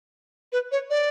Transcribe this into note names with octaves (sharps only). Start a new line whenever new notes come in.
B4
C#5
D5